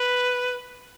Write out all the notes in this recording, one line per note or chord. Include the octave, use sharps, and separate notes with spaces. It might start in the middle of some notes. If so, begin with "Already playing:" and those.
Already playing: B4